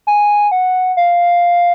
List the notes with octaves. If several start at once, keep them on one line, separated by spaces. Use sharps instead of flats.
G#5
F#5
F5